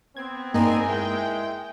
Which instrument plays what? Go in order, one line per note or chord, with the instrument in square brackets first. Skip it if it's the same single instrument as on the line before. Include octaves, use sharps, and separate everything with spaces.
[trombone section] B3 C4 [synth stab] G#6
[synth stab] G2 A#3 [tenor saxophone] D#4 [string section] G#4 A#4 G#5
[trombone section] G#3 [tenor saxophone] E4 [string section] G5